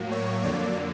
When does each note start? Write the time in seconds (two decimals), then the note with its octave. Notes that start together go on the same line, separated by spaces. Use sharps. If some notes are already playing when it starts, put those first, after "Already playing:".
Already playing: A2 F#3 A#3
0.12 C#5
0.43 F2 D3 F#3 A#3 D5